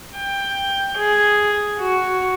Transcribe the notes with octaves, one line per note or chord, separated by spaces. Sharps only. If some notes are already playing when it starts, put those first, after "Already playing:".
G5
G#4
F#4